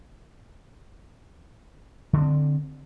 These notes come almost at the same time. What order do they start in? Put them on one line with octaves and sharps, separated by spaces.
D3 B3 C4